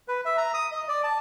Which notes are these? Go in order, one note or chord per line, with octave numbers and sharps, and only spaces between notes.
B4
E5
A#5
D#6
D#5
D5
A5